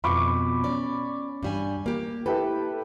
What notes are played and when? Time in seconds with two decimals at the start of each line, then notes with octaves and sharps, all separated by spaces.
0.04 F2 B2 B5 C#6 D6
0.64 C#4 D5
1.43 G2 G3 G#5
1.86 A#3 G4
2.26 E4 G4 A4 B4